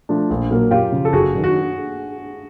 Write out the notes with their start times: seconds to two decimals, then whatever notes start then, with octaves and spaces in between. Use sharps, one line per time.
0.09 F3 A3 D4
0.30 A#1
0.50 A#2 F#3 A#3
0.71 F#2 F4 G4
0.92 C#3 F3
1.05 A4
1.13 F#1 F#4 G#4
1.34 F#2 D#3
1.44 F#4